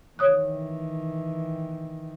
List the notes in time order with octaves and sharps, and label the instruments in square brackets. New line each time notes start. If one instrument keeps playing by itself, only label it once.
[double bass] D#3 E3 [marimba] C#5 D#6 F#6